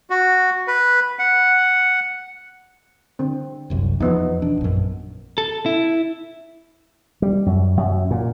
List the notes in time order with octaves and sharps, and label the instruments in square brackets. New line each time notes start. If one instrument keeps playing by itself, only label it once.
[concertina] F#4
B4
F#5
[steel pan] D3 C4
[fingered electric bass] F#1 C2 F#2
[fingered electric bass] E2 [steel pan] F3 B3 D#4
[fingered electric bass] E1 D4
A#1 F#2
[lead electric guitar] A4
E4
[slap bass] G3
F#2
F#2
A#2